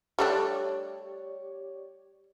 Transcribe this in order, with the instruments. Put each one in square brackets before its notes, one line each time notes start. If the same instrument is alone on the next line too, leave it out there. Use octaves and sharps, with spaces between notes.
[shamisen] G3 A3 D4 [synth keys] G4 C#5 D5